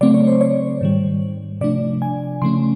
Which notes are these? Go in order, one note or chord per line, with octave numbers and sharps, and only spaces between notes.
C#3 F#3 A3 C4 D5
C#5
C5
C#5
G#2 D#3 G3
C3 F3 A3 D4 D5
G#5
C#3 F3 A3 C#4 C6